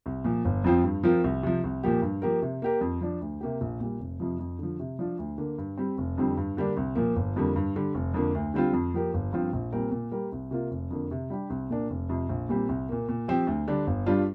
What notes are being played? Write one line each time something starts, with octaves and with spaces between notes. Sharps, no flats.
C2
A#2 F3
G1
F2 F3 C4 F4
G2
F3 C4 F4 A#4
C2
C3 F3
C2
A#2 F3 A#3 G4
G2
F3 A#3 G4 A#4
C3
A#3 G4 A#4
F2
F3 D4
D2
C3 A#3 G4
A#1
A#2 G3
F1
F2 C3 F3
F2
D3 F3
C3
F3 D4 F4
D2
D3 A#3
G2
G3 C4
F1
F2 D3 G3 C4
G2
D3 G3 A#3 D4
C2
A#2 F3 A#3
G1
F2 D3 G3 A#3
G2
D3 G3
F1
F2 D3 A#3
D2
D3 G3 C4 F4
F2
F3 A#3 G4 A#4
G1
G2 F3 C4 F4
A#1
A#2 G3 C4 A#4
A#2
G3 A#3 G4 A#4
C2
C3 A#3 F4
F1
F2 D3 A#3
C3
G3 D4 G4
C2
A#2 A#3 D4
F1
F2 C3
A#1
A#2 G3 C4 G4
C2
A#2 A#3
A#2
F3 C4 G4
D2
D3 G3 D4
G1
G2 G3 D4 F4